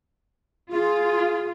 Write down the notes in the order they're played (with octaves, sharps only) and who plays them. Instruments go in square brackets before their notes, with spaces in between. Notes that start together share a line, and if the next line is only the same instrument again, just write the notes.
[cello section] F4 [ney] G#4